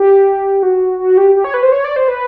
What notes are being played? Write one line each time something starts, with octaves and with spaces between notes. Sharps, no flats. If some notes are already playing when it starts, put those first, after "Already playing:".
Already playing: G4
F#4
F#4
G4
G4
C#5
B4
C5
C#5
D5
C5
B4